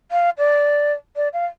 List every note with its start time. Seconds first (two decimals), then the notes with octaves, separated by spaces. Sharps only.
0.11 F5
0.38 D5
1.16 D5
1.33 F5